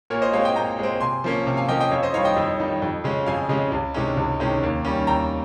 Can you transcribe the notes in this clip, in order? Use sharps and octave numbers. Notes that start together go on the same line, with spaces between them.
A#2 A#4 C#5
C5 D#5
G#3 C4 C#5 F5
D#5 G5
A#2 G5 A#5
G#3 C4
C3 G#5 C6
F3 A#3 C#4
C3
F5 G#5
F3 A#3 C#4 D#5 G5
D#5 G5
F2 C#5 F5
C5 D#5
D#3 G3 C#5 F5
D#5 G5
F2
D#3 G3
F2
C#3 G#3 C#4
F2 F5 G#5
C#3 G#3 C#4
C#2
C3 D#3 G#3 C#4
C#2
C3 D#3 G#3 C#4
D#2
D#3 G3 C#4
D#2 G5 A#5